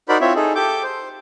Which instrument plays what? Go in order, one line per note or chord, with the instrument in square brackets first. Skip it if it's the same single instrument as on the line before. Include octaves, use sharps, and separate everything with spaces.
[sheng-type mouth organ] D#4 F#4 A#4 C5 D5 B5
C4 E4 F4 C#5 E5
D#4 G#4 A4
G4 A4 D6 G6
C5